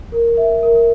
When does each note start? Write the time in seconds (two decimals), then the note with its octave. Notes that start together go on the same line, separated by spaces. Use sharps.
0.12 A#4
0.37 E5
0.63 A#4